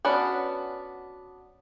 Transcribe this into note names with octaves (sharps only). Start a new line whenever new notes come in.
B3 C#4 D4 F#4